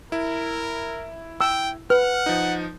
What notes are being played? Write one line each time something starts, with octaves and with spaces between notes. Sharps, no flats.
E4 A#4
G5 E6
B4 F#5 F6
F3 D#4